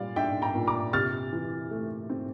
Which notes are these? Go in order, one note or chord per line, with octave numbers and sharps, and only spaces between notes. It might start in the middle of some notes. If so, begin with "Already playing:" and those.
Already playing: A#2 G3 D5 F5
D4 E5 G5
G5 A#5
A#2
A#5 D6
C3 F6 A6
E3
A3
C4